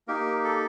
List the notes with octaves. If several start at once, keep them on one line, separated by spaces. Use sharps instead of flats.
A#3 D#4 G4 A#4
A4